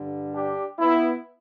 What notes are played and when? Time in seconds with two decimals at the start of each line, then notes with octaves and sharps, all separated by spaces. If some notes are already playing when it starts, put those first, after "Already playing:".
Already playing: G2 D3 G3
0.35 D4 G4
0.79 B3 E4